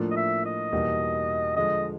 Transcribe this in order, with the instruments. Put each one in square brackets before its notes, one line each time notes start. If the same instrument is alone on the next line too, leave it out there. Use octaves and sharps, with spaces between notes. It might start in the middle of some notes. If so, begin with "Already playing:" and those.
Already playing: [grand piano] A2 F3 A#3 D4 F4
[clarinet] D#5
E5
D#5
[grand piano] E2 B2 G3 A#3 D#4
[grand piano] D3 F3 G#3 [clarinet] D#5